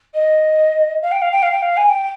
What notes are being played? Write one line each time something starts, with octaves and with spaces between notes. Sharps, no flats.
D#5
F5
G5
F5
G5
F5
G5
F5
G#5
G5